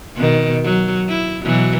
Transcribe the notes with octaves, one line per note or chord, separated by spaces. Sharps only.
B2 D#3
F#3
E4
B2 E3 F#3